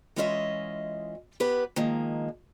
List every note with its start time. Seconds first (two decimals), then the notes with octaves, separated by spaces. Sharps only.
0.16 E3 G#3 C#4 F4 D#5 E5
1.40 B3 G4 B4
1.76 D#3 F3 G#3 A#3